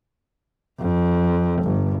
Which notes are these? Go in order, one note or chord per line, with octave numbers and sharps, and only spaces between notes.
F2
G1